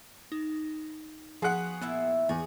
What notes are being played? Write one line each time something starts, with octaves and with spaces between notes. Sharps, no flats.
D#4
F3 B3 F#4 G#4 F#5 F#6
A#2 B3 E4 E5
E2 G#4 G#5